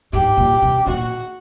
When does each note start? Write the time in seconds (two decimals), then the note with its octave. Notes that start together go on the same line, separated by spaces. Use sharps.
0.13 G#2 G4
0.38 A#2
0.62 B2
0.86 A#2 F#4